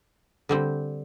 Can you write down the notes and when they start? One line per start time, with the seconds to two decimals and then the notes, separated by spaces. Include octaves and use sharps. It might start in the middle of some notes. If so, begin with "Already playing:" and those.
0.49 D3 G3 C4